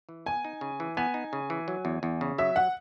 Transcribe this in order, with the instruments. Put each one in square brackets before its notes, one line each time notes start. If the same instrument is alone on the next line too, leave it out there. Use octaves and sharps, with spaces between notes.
[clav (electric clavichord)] E3
[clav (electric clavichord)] B3 [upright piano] G#5
[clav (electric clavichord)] D#4
C#3
E3
[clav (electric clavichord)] B3 [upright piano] G#5
[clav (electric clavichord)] D#4
C#3
E3
F#3
E2
E2
C#3
[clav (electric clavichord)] F#3 [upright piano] E5
[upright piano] F#5